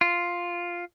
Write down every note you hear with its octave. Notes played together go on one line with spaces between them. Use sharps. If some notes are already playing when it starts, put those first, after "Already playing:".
F4